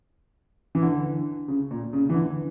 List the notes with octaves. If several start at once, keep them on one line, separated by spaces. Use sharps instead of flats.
E3
D3
C#3
A#2
C#3
E3
D3